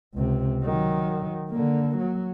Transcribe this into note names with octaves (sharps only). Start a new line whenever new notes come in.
C#2 C3
D#3 F#3
D3 A#3
F#3